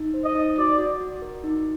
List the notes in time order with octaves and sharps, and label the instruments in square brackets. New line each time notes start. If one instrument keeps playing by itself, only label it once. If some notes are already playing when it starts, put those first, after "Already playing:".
Already playing: [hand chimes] D#4
C5
[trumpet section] D#5
[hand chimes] D#4
[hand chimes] F#4 [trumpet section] D5
[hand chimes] F#4
F#4
A#4
D#4